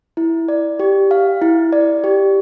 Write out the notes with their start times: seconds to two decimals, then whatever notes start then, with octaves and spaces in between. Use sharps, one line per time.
0.17 E4
0.48 D5
0.80 G4
1.11 F5
1.42 E4
1.73 D5
2.04 G4